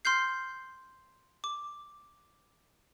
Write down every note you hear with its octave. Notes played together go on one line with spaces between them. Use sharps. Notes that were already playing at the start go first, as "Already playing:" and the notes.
C6 F6 G6 C7
D6